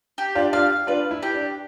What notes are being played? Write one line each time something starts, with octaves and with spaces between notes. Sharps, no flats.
G4
D4 F4
D4 F4 F5
D4 F4 B4
E4
G4
D4